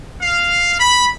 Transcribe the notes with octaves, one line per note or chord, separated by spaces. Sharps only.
F5
B5